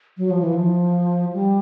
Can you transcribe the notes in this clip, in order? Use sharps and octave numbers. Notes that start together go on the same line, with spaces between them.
F#3
F3
E3
F3
G3